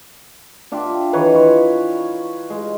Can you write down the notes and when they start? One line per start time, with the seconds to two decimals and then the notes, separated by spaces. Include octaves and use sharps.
0.72 D4 F4 E5 G5
1.13 D#3 E3 B4 C#5
1.34 F4 C#5
2.50 G#3